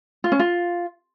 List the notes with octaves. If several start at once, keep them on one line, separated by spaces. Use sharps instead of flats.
F4
C#4
F4